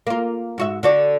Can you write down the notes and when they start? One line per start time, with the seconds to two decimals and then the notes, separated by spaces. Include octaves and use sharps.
0.07 A#3 F4
0.58 G#2 F#4 E5
0.83 D3 F#4 D5